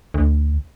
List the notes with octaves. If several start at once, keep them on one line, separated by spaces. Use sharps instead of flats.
D2